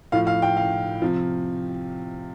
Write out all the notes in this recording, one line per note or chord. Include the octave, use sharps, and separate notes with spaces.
A2 F3 F5
F5
G5
F5
C3 F3